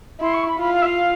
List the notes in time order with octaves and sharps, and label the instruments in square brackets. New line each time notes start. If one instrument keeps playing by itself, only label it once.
[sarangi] E4 [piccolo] C6
[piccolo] C#6
B5
[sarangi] F4 [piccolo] B5
[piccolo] F5
E5
F5